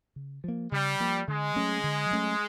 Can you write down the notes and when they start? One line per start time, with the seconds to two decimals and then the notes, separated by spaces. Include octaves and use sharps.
0.16 C#3
0.44 F3 A#3
0.72 C#3 G3
1.00 F3 A#3
1.28 D3 G#3
1.56 F#3 A3 C#4
1.83 D3
2.11 F#3 A3 C#4